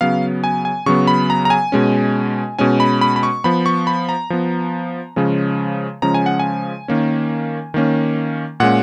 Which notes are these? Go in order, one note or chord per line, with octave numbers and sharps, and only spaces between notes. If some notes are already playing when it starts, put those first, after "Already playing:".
C#3 F#3 B3 F5
G#5
G#5
C#3 F#3 B3 C#6
B5
A#5
A#5
G#5
B2 G#3 C#4
B2 G#3 C#4 G#5
B5
B5
B5
C#6
F3 B3 B5
C#6
B5
A#5
F3 B3
C#3 F3 G#3 C#4
C#3 F3 G#3 C#4 A#5
G#5
F#5
G#5
D#3 A#3 C#4
D#3 A#3 C#4
A#2 G#3 C#4 F#5